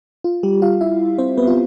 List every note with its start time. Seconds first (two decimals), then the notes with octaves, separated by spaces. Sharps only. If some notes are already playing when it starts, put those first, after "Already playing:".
0.24 F4
0.43 G3 G4
0.62 F4 F5
0.81 E4 E5
1.18 C4 C5
1.38 B3 B4
1.47 F4